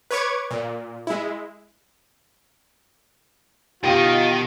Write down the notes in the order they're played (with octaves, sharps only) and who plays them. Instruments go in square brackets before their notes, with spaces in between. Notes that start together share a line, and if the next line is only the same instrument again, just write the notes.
[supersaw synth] B4 C#5 C#6 D6 G#6
A#2
G#3 E4
[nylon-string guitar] B2 G4 [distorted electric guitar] D#3 D#5 [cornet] F4